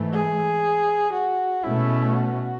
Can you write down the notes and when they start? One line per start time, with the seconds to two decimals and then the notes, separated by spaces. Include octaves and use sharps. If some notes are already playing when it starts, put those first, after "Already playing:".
Already playing: G#2 E3 A3
0.13 G#4
1.13 F#4
1.63 B2 A3 C#4 E4
2.14 F#4